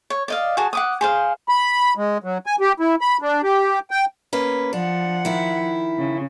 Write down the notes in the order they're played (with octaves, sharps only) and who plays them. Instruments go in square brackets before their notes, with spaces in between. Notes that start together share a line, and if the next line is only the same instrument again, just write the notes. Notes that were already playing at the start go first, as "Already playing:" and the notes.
[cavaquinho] C#5
D5 D#5 F5
F#4 G#4 A5
F#5 D6 D#6
G#4 C5 F5
[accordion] B5
G#3
F#3
G#5
G4
E4
B5
D4
G4
G5
[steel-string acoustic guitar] A#3 C#4 B4
[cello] F3 F#5 [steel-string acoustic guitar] D4
[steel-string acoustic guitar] D#3 E4
[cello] C#3